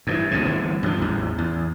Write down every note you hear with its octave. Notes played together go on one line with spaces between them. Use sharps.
G2 D#3 E3
D2 G#2 C3
G1 E3 B3
G2 F3
A1 E2
E2